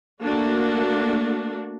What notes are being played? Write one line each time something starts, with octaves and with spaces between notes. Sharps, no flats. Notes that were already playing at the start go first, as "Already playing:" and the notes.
A3 A#3 D4 F#4